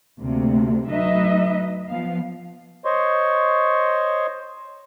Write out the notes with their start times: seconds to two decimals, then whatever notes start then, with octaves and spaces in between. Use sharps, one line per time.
0.19 D2 C3 A#3
0.88 D2 F#3 D#4 B4 D#5 E5
1.88 F3 B3 F5
2.85 C5 C#5 D#5 C6 C#6